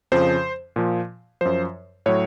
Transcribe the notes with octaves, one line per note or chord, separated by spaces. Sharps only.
F2 C#3 F3 C5
A#2 F3
F#2 F3 C5
A2 F#3 C#5